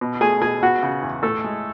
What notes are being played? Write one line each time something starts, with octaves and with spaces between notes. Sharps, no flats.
B2
A3 G#4 G#5
B2 G#4 G#5
B3 F#4 F#5
C#3
E2
A2 A3 A4
G#3